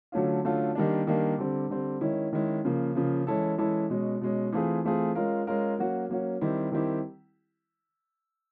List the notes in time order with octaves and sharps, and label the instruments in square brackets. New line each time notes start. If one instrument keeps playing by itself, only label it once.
[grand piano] D3 F#3 A3 C#4 F4
D3 F#3 A3 C#4 F4
D#3 G3 A#3 D4
D#3 G3 A#3 D4
D3 G3 C4
D3 G3 C4
D#3 G#3 C#4 E4
D#3 G#3 C#4 E4
C#3 F3 A#3
C#3 F3 A#3
E3 G#3 C#4 E4 A4
E3 G#3 C#4 E4 A4
B2 G#3 C#4
B2 G#3 C#4
E3 A3 C4 F4 G#4
E3 A3 C4 F4 G#4
G#3 C#4 F4 A#4
G#3 C#4 F4 A#4
F#3 A#3 C#4 F#4
F#3 A#3 C#4 F#4
D#3 G3 C4 E4 G4
D#3 G3 C4 E4 G4